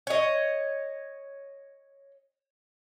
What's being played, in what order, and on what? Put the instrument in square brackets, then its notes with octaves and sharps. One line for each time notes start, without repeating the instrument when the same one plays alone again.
[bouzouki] C#5 D#5